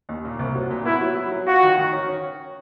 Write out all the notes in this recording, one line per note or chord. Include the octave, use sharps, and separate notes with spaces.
D#2
A#2
C2
F#3
A#2
B3 E4
F#3
F#3
F#3
F4 F#4
D#3
D#3
C#4
C#4